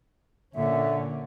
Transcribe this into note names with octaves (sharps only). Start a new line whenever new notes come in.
A#2 D3 C#4 E5